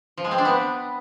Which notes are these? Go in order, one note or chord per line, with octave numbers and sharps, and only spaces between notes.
F3
G#3
C4
D4
B3